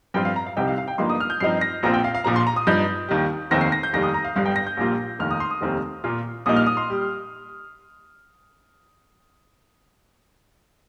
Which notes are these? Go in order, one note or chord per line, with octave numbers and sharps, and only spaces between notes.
G2 F3 C4 F4 G5
F5
A#5
F5
C2 C3 G3 C4 D#4 G5
F5
F5
G5
G1 G2 F3 A#3 D#4 C6
D#6
F6
G6
G2 F3 C4 D#4 C7
A#6
A#1 A#2 F3 C4 F4 A#5
G5
F5
F5
A#1 A#2 F3 A#5
C6
A#5
D#6
G2 F3 D#4 G6
D#2 D#3 G3
F1 D#2 D#3 C4 A#6
C7
A#6
G6
F1 D#2 D#3 G3 A#6
D#6
A#5
F5
G1 G2 G3 F5
G5
A#6
G6
A#1 A#2 G3 A#3 F4
F1 D#2 D#3 F6
D#6
C6
D#6
F1 D#2 D#3 G3 C4
A#2 A#3 F4
A#1 A#2 G3 A#3 D#4 D#6
F6
D#6
C6
G3